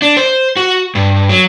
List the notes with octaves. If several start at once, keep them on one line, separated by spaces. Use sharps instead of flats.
D4
C5
F#4
G2
F#3